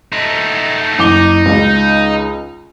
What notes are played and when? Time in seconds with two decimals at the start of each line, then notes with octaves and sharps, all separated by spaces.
0.12 A3 D#4
0.99 F#1 D#4 D6 G7
1.46 C#2